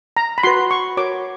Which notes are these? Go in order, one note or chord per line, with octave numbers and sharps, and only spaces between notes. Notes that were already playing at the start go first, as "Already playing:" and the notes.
A#5
B5
F#4 B4 C6
C#6
F#4 A#4 C#5 D6